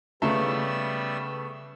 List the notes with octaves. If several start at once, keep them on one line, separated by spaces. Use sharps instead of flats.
C#3 G3 A3 B3 E6